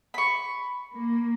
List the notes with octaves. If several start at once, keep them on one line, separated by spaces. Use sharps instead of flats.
B5 C#6
A#3